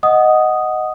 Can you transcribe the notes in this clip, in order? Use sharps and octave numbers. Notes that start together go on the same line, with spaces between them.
D#5 F#5 D#6